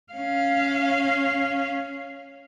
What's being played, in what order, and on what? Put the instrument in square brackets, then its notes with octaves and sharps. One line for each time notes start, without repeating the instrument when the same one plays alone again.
[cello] C#4 F5